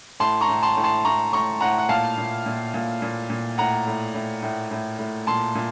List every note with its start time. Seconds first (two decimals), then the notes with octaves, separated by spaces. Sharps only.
0.20 A2 A5 C6
0.41 A#5 C#6
0.48 A2
0.63 A5 C6
0.77 A2
0.84 A5 C6
1.05 A2 A#5 C#6
1.33 A2 A#5 C#6
1.61 A2 F#5 A#5
1.78 F#5
1.89 A#2 F5 A5
2.17 A#2
2.46 A#2
2.74 A#2
3.02 A#2
3.30 A#2
3.58 A2 F#5 A#5
3.87 A2
4.14 A2
4.43 A2
4.71 A2
4.99 A2
5.27 A#2 A5 C6
5.55 A#2